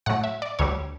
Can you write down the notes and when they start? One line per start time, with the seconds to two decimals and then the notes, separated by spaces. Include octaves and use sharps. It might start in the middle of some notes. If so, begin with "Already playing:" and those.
0.06 A2 F#3 A3 F#5
0.24 E5
0.42 D5
0.59 D2 D3 G3 C#5